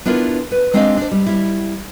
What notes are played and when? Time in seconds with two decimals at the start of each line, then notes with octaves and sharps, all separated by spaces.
0.06 B3 D4 E4 F4 A#4
0.51 B4
0.74 G#3 C4 D4 G4 D#5 F5
0.97 D4 C5
1.11 G3
1.26 G3 E4